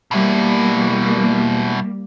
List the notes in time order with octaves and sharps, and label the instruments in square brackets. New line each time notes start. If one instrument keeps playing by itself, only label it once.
[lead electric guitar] B2 E4 [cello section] G3 A#3